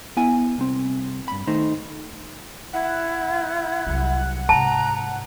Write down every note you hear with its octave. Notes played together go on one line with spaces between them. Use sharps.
B3 E4 G#5
C2 C4
G2 B5
D#3 A3 D#4 C5
E4 F#5
C2 F#3
G#2 C3 A5 A#5